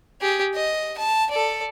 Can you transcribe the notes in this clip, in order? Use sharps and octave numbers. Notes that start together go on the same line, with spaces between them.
G4 G#4
D#5
A5
A4 D5